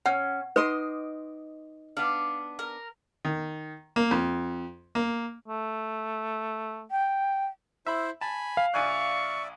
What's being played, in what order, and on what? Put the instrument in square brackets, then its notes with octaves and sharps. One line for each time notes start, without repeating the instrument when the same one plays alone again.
[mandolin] C#4 [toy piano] F#5
[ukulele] D#4 D#5 [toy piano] B4 [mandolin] C6 D6
[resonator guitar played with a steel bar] B3 D4 [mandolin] F5
[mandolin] A#4
[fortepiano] D#3
A#3
F2
A#3
[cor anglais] A3
[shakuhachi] G5
[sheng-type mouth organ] E4 C5 [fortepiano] E5 B5
[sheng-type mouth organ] G#5 B5 [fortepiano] A5
[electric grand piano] F5
[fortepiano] A#1 G#5 F#6 [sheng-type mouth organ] D5 E5 [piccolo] C#6